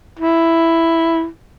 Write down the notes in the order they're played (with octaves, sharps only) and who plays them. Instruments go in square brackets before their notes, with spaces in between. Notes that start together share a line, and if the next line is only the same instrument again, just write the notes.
[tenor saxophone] E4